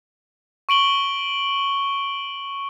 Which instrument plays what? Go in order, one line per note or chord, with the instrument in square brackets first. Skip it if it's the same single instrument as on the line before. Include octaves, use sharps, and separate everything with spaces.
[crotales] C#6 D7 F#7 G7